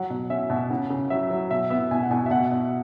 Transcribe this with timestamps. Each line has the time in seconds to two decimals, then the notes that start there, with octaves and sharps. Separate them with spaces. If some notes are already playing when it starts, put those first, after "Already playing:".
Already playing: F#3 F#5
0.10 B2
0.30 C#4 E5
0.50 B2
0.70 C#3 F#5
0.90 C#3
1.10 F#3 E5
1.31 F#3
1.51 B2 E5
1.70 B3 E5
1.91 B2 G#5
2.03 F#5
2.11 B2 G#5
2.26 E5
2.30 B2 F#5
2.51 B2 E5